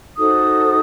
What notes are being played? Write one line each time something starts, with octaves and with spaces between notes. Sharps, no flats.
D#4 F#4 A4 C5 D#6